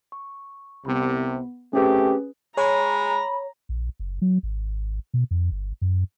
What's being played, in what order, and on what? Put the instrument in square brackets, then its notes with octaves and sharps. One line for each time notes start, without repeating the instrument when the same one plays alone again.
[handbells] C#6
[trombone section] C2 C3 [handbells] B3 B5
[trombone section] A3 C4 G4 [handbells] C#4 G#4 B4
[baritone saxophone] G#3 [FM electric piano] C#5 [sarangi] A#5 [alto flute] B5
[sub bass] A#1
F#1
F#3
G#1
B2
F2
G1
F#2